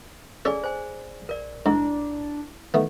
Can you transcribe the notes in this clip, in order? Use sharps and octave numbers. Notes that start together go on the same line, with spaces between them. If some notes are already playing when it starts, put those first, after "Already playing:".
D1 C#4 G#4 A4 D5 G#5
C5 G#5
A#1 A#4 D5
G#2 D4 E4
D#3 E3 A3 B3